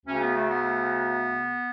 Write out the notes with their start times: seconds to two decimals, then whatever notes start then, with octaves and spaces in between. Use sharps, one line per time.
0.06 D2 C#3 C#4
0.21 B3
0.35 A3
0.47 B3